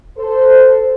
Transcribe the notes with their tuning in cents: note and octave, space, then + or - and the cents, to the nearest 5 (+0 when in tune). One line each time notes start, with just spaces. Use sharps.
A4 +0 C5 -10